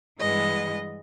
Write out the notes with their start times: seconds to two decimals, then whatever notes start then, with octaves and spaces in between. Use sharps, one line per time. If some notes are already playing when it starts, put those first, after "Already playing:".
0.19 G2 E3 G#3 B3 D#5